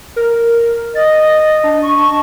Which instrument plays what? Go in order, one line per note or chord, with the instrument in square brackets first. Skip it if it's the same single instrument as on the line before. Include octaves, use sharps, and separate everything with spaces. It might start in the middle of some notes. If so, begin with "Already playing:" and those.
[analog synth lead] A#4
[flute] D#5 [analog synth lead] A6
[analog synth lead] D4
[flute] C#6
[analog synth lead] A5